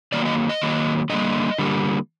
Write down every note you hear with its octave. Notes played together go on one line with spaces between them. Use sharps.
D#3 F#3 A#3 D5
D#5
D#5
D#3 F#3 A#3
D3 G3 A#3 D#5
D3 G3 A#3